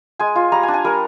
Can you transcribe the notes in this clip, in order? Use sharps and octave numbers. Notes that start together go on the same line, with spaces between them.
G#3 G#5
F4
G3 A#5
G#5
D4
G#5
G3 A#4